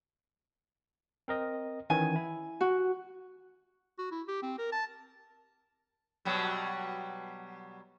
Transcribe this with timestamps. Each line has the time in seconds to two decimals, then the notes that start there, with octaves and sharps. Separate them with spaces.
1.28 C4 A#4 D#5
1.90 D#3 E3 C#4 G#5
2.16 E4
2.61 F#4
3.99 F#4
4.11 E4
4.28 G4
4.43 C4
4.59 A#4
4.72 A5
6.25 B2 F#3 G3